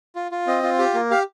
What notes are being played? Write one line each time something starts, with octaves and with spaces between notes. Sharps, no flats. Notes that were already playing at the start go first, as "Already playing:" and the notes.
F4
F4
C4 D#5
F4
G4
A#3
G4 F5